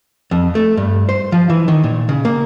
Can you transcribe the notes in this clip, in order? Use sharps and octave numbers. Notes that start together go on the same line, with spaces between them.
F2
A3
G2
C5
F3
E3
D#3
A#2
C#3
A#3